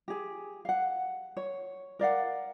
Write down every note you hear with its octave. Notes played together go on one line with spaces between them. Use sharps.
G4 G#4
F5 F#5
C#5
A#4 D5 F5 F#5